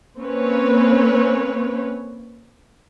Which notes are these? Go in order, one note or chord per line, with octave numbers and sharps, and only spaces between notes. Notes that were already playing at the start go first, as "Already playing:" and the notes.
A#3 C4 C#4 B4 C#5